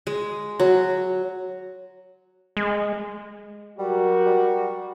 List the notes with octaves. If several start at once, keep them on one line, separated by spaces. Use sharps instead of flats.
G#3
F#3
G#3
F#3 G3 F#4 G4 A#4
G3